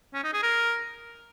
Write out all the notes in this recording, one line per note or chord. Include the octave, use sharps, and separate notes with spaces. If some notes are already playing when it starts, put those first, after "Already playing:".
C#4
D#4
G#4
A#4